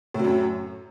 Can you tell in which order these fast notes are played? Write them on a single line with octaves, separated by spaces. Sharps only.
A2 F#3 F#2